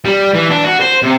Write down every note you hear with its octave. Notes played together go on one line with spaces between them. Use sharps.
G3
E3
D4
F#4
C5
C3